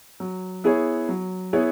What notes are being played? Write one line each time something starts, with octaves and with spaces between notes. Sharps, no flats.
F#3
B3 E4 G#4 C#5
F#3
B3 E4 G#4 C#5